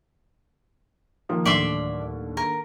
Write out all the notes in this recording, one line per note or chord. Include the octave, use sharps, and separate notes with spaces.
D#3 F3 A#3
D1 D#2 A2 D3 D5 E5 C6
A#4